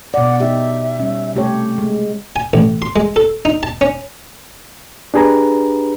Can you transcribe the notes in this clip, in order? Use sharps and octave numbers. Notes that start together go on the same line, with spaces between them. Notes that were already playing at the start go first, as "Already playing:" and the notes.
B2 D5 F#5
D#4 G4 E5
G3 C#4
C3 A3 G4 C#5
G#3
G#5
A1
C6
G#3
A4
D#4
A5
C#4
D4 G4 G#4 B4 A#5